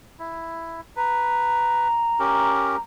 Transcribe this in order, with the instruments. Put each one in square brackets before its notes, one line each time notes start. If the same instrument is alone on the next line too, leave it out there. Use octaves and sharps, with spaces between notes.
[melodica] E4
[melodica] B4 [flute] A#5
[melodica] C#4 G4 A#4